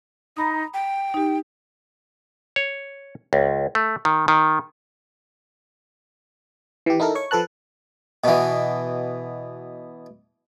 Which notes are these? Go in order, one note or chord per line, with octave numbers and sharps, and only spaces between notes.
D#4 A#5 B5 D#6
G5
D#4 G4
C#5
C#2
A3
D#3
D#3
E3 G4
D#4 E4 A4 A#4
C#5 C#6
F3 A4 B4 A5 F#6
B2 E3